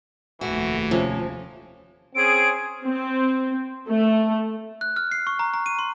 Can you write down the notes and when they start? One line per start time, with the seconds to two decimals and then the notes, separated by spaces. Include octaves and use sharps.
0.41 F1 D#2 E3 A3 F#4
0.91 C3 F3 C#4
2.15 C4 C#4 G#4 D7
2.85 C4
3.87 A3
4.81 F#6
4.96 F6
5.12 C7
5.27 C#6
5.39 A#5
5.54 A#5
5.66 D#7
5.79 C6